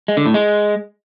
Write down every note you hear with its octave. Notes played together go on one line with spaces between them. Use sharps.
G#3
D3
A2
G#3